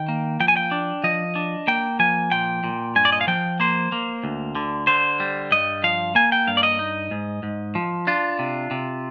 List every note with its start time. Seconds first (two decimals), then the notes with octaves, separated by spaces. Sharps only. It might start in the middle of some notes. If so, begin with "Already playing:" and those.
Already playing: D#3 G5
0.08 A#3
0.40 F3 G5
0.48 G#5
0.57 G5
0.71 D4
1.04 F3 D#5
1.35 D4
1.68 A#3 G5
1.99 F3 G#5
2.32 A#2 G5
2.64 A#2
2.96 G2 G#5
3.05 D5
3.12 D#5
3.21 F5
3.27 F3 G5
3.60 A#3 C5
3.92 A#3
4.24 D2
4.55 D3
4.87 D3 C5
5.20 G3
5.51 G2 D#5
5.83 F3 F5
6.15 A#3 G#5
6.32 G5
6.47 G2 F5
6.57 D5
6.63 D#5
6.79 D#4
7.11 G#2
7.43 G#2
7.75 F3
8.07 D4 F4
8.39 C3
8.71 C3